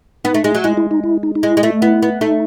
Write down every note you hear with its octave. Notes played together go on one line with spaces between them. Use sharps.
B3 D#4
A3
G#3
F#3
G#3 E4
E4
D#4
E4
D#4
D#4
G#3 E4
G#3
A3
B3 E4
B3
A3 D#4